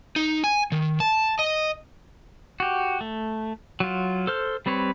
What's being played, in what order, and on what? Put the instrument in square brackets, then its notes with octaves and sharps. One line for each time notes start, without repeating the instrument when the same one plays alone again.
[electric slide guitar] D#4
G#5
D#3
A5
D#5
[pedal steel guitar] F#4 G4
A3
F#3 F4
A4 C5 F6
G3 C4 B4 C#5